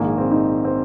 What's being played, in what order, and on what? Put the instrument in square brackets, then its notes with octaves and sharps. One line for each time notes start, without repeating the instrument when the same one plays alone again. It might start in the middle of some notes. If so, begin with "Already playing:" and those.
Already playing: [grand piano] A#1 G#2 D#3 A#3
C4
D#4
C4